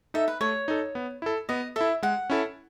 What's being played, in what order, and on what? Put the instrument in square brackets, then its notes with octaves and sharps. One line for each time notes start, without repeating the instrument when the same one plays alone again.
[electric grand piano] D#4 A4 [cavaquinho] E5
[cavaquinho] B4
[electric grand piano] A3 [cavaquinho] C#5
[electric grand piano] D#4 A4
B3
E4 A4
[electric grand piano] B3 [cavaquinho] D#5
[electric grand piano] E4 A4 [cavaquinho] E5
[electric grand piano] G#3 [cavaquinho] F#5
[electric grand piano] C#4 E4 A4